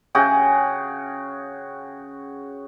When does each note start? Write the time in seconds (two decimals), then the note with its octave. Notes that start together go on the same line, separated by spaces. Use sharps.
0.15 C#3 F#4 G#4 G5